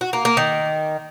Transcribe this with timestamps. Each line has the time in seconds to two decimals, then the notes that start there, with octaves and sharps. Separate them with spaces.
0.01 F#4
0.13 A#3
0.25 A#3
0.37 D#3